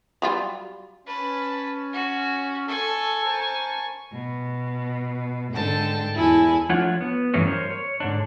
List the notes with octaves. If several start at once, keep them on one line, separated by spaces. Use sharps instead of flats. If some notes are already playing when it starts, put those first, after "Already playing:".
F#3 G3 F4
C#4 B4 A5
F#4
A4 G#5 C#6
A#4 C5 A5
B2
G#2 D3 A4 G5 A5
E2 E4 A4 G#5
F3 A3 D4 F4 C#5 F#5
B3
G2 E3 F#3 A3 C#4
A#4 C5 C#5
C#5
G#2 D3 D4